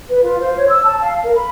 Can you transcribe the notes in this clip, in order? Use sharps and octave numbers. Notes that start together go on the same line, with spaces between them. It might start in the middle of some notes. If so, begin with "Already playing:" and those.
B4
F4
C5
C#5
E6
A5
F5
A#4
B5